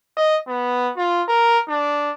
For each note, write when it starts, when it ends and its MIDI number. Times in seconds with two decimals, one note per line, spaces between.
0.17 0.37 75
0.48 0.92 59
0.97 1.23 65
1.28 1.59 70
1.68 2.11 62